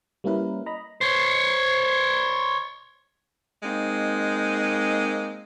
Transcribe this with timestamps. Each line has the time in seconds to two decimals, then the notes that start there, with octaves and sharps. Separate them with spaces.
0.24 G3 A#3 C#4 E4 A#4 B4
0.66 D#5 A#5 B5
1.01 C5 C#5
3.63 G#3 A#3 C4 D#4